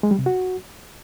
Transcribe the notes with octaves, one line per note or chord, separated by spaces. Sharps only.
G#3
G3
C3
F#4